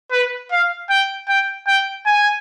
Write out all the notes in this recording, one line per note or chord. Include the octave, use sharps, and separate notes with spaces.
B4
F5
G5
G5
G5
G#5